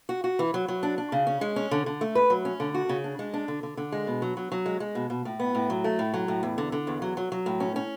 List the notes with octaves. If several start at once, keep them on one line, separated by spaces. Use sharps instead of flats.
F#4
F#4
E3
F#3
F#3
D4
D4
C#3
C#4
G#3
C#4
D3
D3
A3
B4
F#3
C#4
D3
F#4
C#3
D4
G#3
D4
D3
D3
D3
G#3
B2
F#3
F#3
F#3
G#3
G#3
B2
B2
A2
B3
A2
F#3
A3
A2
F#3
A2
E2
D3
D3
E2
F#3
F#3
F#3
A2
C#4
C#4